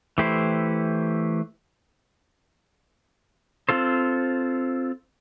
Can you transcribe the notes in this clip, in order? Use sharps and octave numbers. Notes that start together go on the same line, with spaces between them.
E3 A3 E4 G4 C5
C4 F4 A4 C5